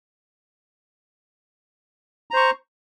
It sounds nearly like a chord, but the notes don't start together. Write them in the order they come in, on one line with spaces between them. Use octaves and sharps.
A#5 C5 C#6